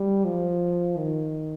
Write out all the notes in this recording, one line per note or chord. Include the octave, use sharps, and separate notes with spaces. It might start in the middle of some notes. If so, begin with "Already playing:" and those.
Already playing: G3
F3
D#3